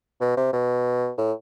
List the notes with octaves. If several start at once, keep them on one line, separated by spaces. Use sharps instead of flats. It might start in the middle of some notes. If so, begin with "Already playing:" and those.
B2
C3
B2
A2